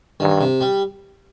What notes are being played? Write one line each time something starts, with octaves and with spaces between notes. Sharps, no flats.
G2 D#3
C3
G3